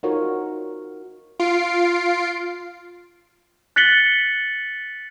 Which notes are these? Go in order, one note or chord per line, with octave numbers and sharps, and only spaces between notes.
D#4 F4 F#4 A#4 C5 C#5
F4 C7 D7
F#6 A6 B6 C#7 F#7 G7